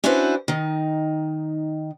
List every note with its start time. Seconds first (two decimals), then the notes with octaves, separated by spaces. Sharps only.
0.04 C#4 D4 E4 F#4 B4 C5
0.48 D#3 D#4